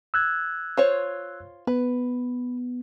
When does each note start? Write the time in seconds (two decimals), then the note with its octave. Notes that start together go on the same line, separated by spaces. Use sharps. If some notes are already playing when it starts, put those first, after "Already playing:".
0.14 E6 F#6 G#6
0.77 F4 C5 C#5
1.67 B3 B4